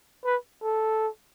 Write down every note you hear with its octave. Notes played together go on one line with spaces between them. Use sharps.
B4
A4